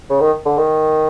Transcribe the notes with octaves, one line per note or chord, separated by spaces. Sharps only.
C#3
D#3
D3
D#3